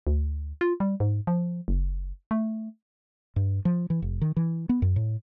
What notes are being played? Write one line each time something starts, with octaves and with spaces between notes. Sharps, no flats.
D2
F4
G3
G#2
F3
F#1
A3
G2
F3
E3
F1
D#3
E3
B3
F#2
A2